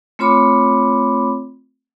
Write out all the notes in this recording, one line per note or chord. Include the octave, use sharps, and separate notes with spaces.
A3 C4 F4 C#5 B5 D6